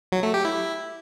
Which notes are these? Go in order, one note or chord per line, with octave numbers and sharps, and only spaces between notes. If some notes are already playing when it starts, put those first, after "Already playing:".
F#3
A3
G4
E4